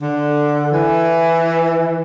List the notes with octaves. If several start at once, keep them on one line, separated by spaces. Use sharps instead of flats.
D3
E3